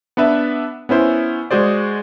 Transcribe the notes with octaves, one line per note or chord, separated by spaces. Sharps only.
B3 D4 B4 E5
B3 C#4 E4 C5
G#3 F#4 G#4 C5 D5